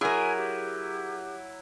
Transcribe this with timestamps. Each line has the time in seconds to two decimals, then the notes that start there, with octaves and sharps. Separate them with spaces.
0.01 F#3 E4 G#4 A#4 G#5
0.37 G4